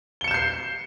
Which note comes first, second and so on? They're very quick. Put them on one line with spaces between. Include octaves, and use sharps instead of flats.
G7 C#7 E7 G6 C7